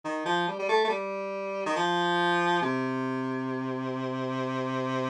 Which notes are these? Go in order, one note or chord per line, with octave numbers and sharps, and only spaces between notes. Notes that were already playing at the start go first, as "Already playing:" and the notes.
D#3
F3
G3
G3
A3
A3
G3
D#3
F3
C3